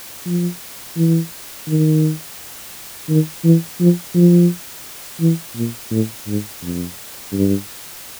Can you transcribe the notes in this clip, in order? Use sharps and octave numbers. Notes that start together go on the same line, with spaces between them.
F3
E3
D#3
D#3
E3
F3
F3
E3
A#2
A2
G#2
F2
G2